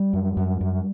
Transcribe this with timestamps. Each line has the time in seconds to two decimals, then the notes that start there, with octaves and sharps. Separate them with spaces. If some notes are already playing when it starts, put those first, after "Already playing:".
Already playing: G3
0.13 F#2
0.37 F#2
0.61 F#2